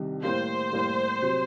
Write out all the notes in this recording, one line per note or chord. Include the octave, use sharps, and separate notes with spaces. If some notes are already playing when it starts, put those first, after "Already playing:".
Already playing: C2 C3 D#3
A2 G3 A#3 C5
A2 G3 A#3
C3 F#3